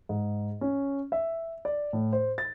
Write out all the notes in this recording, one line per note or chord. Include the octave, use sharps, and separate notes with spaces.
G#2
C#4
E5
D5
A2
C5
A6